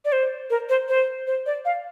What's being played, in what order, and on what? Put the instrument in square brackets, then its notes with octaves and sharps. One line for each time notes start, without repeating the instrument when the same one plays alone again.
[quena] D5
C5
A#4
C5
C5
C5
D5
F5